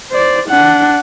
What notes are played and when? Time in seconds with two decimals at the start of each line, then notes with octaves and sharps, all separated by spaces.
0.11 C5 D5
0.49 D4 F#5